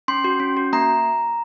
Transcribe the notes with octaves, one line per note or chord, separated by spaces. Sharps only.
C#4 C6
F#4
C#4
F#4
A#3 A#5